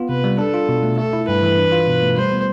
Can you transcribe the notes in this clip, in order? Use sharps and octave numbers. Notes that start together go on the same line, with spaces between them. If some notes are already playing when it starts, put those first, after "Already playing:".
Already playing: B3 F4
C3 B4
G3
D4 A4
F4
B2
A3
A3 A4
E4
G2 B4
E3
D4
F4
B2
A3
G3 C5
B3